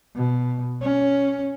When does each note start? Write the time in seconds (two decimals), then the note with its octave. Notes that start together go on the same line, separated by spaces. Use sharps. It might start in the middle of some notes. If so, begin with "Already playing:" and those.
0.15 B2
0.81 C#4